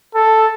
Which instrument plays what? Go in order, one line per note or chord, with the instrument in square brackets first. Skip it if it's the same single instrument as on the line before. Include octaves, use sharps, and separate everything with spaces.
[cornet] A4